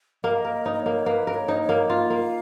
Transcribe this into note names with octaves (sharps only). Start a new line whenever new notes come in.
A#3 D#5
F5
D#5
A#4
D#4 C#5
D#5
C#5
A#3
A#3 B4
A#4
C#5
D#4
C#5
A#3
F4 F5
A#3